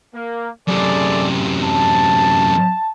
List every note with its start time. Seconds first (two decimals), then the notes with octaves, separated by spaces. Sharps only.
0.15 A#3
0.68 F#2 C3 G#4 A4 D5
1.64 A5